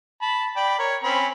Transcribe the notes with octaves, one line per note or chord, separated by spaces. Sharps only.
A5 B5
D5 G5 B5
A#4 C#5
C4 C#4 B5